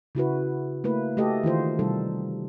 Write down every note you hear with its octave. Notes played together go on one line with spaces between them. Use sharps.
C#3 E4 F#4 B4
A3 A#3 E4 B4
A3 F#4 G4 A4 D#5
D#3 E3 F4 C5
C3 G3 D#4 A4